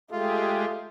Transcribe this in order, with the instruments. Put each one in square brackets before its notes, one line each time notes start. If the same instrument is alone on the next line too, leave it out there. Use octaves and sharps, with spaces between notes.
[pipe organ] G#3 G4 G#4 [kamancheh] A3 [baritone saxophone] F4